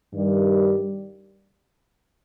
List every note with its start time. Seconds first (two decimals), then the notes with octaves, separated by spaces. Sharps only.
0.13 G2 D#3 G3